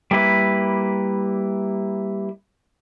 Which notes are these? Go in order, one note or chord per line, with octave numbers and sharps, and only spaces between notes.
G3 A#3 E4 B4